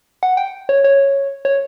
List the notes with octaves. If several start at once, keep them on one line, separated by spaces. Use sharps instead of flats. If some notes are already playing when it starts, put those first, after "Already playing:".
F#5
G5
C#5
C#5
C#5